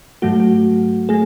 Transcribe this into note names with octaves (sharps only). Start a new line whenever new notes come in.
G#2 F#3 A3 F#4
F#4
A3 G#4